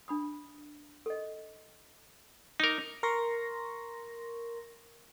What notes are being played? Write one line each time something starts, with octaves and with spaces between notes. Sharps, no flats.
D4 B5 D#6
A4 D#5
D#4 A#4 A#5 D6
A#4 C6 C#6 A#6